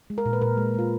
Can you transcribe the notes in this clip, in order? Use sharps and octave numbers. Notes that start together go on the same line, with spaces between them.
G#3
A#4
A#2
B4
A#2 A#4
G#3
G#3 F4